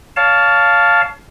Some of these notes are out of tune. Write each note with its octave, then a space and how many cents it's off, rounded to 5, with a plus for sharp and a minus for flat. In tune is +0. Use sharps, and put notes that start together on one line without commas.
C#5 +35 F5 +0 A5 +0